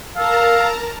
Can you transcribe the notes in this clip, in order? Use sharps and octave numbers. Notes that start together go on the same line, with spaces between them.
A4 A#4 F5 A5 A#5